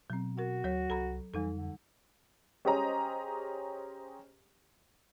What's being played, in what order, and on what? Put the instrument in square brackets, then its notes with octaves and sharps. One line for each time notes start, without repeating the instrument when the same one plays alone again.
[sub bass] B2 [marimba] F#3 C4
[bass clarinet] F#4 [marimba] A#4 F#5
[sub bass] D2 [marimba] F#3 C#5
[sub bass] C2 [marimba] A4 A#5 B5
[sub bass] F2 [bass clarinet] E3 [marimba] G3 D#4 A4
[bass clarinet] D3
[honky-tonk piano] C#4 G4 G#4 C5 D#5 A#5